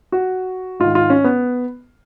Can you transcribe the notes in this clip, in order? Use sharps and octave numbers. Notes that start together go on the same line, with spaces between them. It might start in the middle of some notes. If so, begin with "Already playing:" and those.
F#4
G#2 D#3 F4
F4
C#4
B3